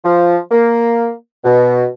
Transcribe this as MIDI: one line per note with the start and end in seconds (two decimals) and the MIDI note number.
0.04 0.37 53
0.51 1.11 58
1.44 1.86 47